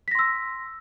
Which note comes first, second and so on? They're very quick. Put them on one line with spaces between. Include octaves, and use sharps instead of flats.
B6 A#6 C6 E6